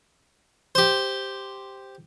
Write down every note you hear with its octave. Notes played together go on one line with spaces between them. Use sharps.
G4 C5